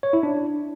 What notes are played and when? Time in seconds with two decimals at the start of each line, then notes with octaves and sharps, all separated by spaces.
0.03 C#5
0.13 E4
0.23 D4